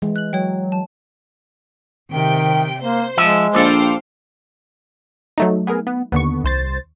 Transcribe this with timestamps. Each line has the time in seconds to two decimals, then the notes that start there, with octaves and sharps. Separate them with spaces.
0.02 E3 G#3
0.16 F#6 F#7
0.33 F#3 C#5 G5
0.72 A5
2.12 C3 D#3 G5
2.82 A#3 C5
3.17 F3 G#3 E5
3.55 A#1 D4 A4 C5 F5 G5
5.38 F#3 A3 D#4
5.67 B3 G#4 A#4
5.87 B3
6.12 D#2 D3 B3 C#6
6.44 C2 C5 A6